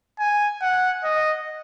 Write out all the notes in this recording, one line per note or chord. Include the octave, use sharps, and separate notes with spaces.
G#5
F#5
D#5